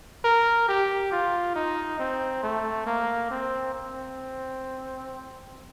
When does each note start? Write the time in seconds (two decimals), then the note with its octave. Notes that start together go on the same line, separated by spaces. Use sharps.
0.25 A#4
0.68 G4
1.12 F4
1.56 D#4
2.00 C4
2.43 A3
2.87 A#3
3.31 C4
3.74 C4